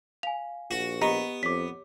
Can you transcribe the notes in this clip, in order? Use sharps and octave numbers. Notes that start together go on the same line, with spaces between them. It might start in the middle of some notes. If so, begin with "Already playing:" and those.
F5 G#5 F7
A#1 F#4
B3 G4 D#5 A#5
F2 C#5 D6 B6